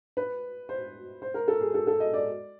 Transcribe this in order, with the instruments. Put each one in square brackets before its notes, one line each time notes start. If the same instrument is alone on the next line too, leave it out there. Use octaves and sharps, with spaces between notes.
[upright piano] B4
C5
C5
A#4
A4
G#4
A4
A4
D#5
D5